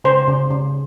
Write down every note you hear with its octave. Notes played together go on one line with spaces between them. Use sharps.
C#3 C5
C#3
C#3